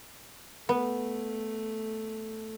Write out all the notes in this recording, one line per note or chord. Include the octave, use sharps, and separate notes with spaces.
A3 B3